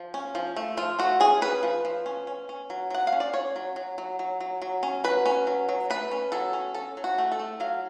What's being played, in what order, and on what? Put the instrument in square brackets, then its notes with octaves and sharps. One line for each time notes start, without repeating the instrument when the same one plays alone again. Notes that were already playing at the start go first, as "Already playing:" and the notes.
Already playing: [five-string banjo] F3
C#4
F3
A3
F3 F4
A3 F#4
C#4 G#4
C#4 B4
F3
F3
C#4
C#4
C#4
F#3
F#3 F#5
F5
C#4
D5
C#4 C#5
F#3
F#3
F#3
F#3
F#3
F#3
C#4
F#3 B4
C#4
F#3
F#3
A3 B4
C#4
F#3 A4
C#4
C#4 A4
F#3
F#4
A3
A4
A3
F#3 F5